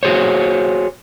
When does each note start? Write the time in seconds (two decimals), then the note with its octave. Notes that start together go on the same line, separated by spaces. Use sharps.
0.03 F#4 G#4 C5 C#5